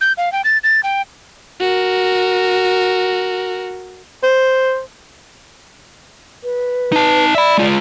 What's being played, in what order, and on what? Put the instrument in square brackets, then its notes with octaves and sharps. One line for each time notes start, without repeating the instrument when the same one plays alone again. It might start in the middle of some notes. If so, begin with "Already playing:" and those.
[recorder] G6
F5
G5
A6
A6
G5
[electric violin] F#4 A#4
[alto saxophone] C5
[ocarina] B4
[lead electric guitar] D#4 A5
[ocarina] D5 [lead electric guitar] E5 B5
[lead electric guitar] G#3 F4